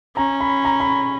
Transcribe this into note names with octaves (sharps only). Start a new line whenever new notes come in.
C#4 A#5
B5
A#5
B5